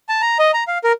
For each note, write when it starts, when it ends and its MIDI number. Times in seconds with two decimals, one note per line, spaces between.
0.09 0.21 81
0.21 0.38 82
0.39 0.51 75
0.54 0.64 82
0.67 0.78 77
0.84 0.92 70